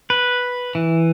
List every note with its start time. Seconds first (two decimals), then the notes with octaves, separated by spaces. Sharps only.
0.10 B4
0.75 E3